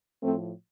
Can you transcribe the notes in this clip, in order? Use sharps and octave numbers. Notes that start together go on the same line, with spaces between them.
A2 F3 A3 C4